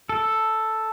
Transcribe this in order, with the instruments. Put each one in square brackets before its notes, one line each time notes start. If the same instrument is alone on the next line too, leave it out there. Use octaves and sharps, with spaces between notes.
[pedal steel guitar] A4